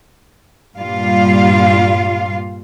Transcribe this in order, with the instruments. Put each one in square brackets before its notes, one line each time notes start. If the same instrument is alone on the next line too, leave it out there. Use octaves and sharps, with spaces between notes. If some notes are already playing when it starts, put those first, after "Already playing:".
[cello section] G2 A#2 G3 F4 F5